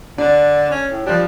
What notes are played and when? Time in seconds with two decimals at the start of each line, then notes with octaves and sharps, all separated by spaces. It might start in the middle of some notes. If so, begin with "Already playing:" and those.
0.18 D3 D4 D5
0.71 C#4
0.92 A2
1.07 F3 G3 D4